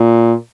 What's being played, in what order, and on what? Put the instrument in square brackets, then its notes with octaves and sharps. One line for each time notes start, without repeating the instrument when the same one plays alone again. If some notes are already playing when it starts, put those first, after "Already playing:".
Already playing: [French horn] A#2